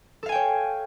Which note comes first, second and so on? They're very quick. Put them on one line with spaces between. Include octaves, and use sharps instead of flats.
A4 F5 G#5 G5 C#5